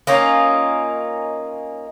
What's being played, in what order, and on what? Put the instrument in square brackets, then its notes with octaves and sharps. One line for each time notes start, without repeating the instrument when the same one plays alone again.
[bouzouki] A#3 C#4 D#4 F4